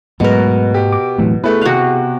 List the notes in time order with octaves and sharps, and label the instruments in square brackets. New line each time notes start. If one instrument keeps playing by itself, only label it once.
[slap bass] G#2 A3 B3 [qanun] B2 A#4 [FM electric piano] F#3 G#3 B4
[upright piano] G4
[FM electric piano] D6
[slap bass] E1 A3 C4 [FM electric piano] A2 E3 F#3
[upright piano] A3 B4 [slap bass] B3 [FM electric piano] E4 G#4
[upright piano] C3 F#6 [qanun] F#4 F5